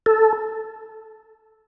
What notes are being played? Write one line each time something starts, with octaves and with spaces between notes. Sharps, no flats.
A4